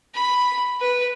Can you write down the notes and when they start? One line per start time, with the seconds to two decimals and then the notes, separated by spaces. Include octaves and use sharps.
0.14 B5
0.80 B4